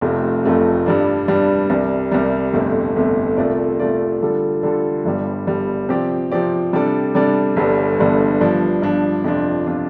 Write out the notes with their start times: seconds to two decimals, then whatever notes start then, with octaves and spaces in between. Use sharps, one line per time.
0.01 F1 F2 C3 A3 F4
0.44 F1 F2 C3 A3 F4
0.86 G2 G3 D4
1.28 G2 G3 D4
1.70 C2 C3 G3
2.11 C2 C3 G3
2.53 G1 F2 C3 A3
2.96 G1 F2 C3 A3
3.37 C2 C3 A3 F4 D5
3.80 C2 C3 A3 F4 D5
4.22 D3 G3 F4 A4
4.63 D3 G3 F4 A4
5.05 G1 G2 G3
5.47 G1 G2 G3
5.89 C3 F3 C4 G4 D5
6.31 C3 F3 C4 G4 D5
6.73 C3 G3 D4 A4 D5
7.15 C3 G3 D4 A4 D5
7.56 G1 G2 D3 G3
7.99 G1 G2 D3 G3
8.41 G2 F3 D4
8.82 G2 F3 D4
9.24 F2 C3 F3 D4 F4
9.67 C3 F3 D4 F4